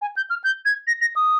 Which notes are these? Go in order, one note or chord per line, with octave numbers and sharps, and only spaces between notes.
G#5
G6
F6
G6
G#6
A#6
A#6
D#6